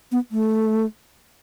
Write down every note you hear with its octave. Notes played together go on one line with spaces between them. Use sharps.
B3
A3